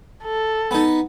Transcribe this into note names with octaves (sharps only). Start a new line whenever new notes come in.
A4
B3 D#4